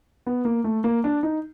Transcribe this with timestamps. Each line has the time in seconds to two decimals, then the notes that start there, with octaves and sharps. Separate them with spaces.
0.27 B3
0.45 A#3
0.64 A3
0.84 A#3
1.04 D4
1.23 D#4